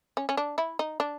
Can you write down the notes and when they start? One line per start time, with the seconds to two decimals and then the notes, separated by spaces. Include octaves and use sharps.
0.17 C#4
0.29 C#4
0.37 D4
0.58 E4
0.79 D#4
1.00 D4